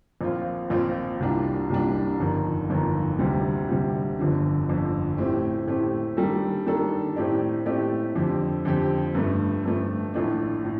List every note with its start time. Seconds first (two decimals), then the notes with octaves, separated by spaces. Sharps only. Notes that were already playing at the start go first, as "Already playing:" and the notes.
0.21 A#1 A#2 F3 C4 F4
0.70 A#1 A#2 F3 C4 F4
1.20 C2 A#2 G3 D4
1.70 C2 A#2 G3 D4
2.19 G1 F2 D#3
2.69 G1 F2 D#3
3.19 D2 C3 G3
3.69 D2 C3 G3
4.18 G1 F2 D3 F3
4.68 G1 F2 D3 F3
5.17 A2 A3 C4 G4
5.67 A2 A3 C4 G4
6.17 D#3 G3 D4 A4
6.66 D#3 G3 D4 A4
7.16 A2 A3 C4 G4 D5
7.65 A2 A3 C4 G4 D5
8.16 F2 D3 F3 C4 G4
8.65 F2 D3 F3 C4 G4
9.15 G2 F3 A3
9.65 G2 F3 A3
10.14 A#1 A2 A3 D4
10.65 A2